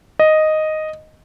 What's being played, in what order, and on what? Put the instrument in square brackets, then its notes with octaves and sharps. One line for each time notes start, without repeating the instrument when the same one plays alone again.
[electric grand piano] D#5